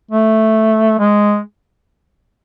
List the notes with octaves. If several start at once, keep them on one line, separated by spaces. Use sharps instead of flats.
A3
G#3